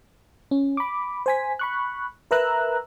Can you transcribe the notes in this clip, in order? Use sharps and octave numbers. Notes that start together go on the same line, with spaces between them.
C#4
B5 D6
C5 G#5 B6
B5 C#6 F#6
A#4 B4 E5 A#5 E6 F#6